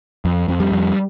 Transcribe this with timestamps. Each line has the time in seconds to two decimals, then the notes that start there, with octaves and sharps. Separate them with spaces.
0.25 F2
0.48 F2
0.60 G3
0.72 F2